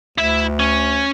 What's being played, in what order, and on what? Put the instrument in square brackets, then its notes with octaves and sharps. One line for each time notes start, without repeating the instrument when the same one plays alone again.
[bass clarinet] D2 [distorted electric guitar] E4 E5
[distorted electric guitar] C#4